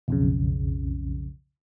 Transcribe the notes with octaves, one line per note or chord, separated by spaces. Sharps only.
B1 F2 C#3